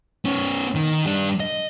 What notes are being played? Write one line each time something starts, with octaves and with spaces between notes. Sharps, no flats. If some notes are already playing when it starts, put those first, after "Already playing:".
B3 C#4
D#3
G3 D4
D#5